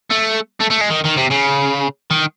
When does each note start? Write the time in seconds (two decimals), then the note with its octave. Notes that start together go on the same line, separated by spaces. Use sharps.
0.10 A3
0.60 A3
0.70 A3
0.81 G#3
0.90 D#3
1.04 D#3
1.16 C3
1.30 C#3
2.11 D#3